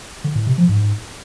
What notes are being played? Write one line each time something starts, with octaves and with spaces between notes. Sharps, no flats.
D3
A2
C3
F3
G#2